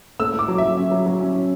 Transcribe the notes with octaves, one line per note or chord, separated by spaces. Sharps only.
A3 E6
A3
D6
F#3
F#3 E5
C#4
F#3
F#3
C#4
C#4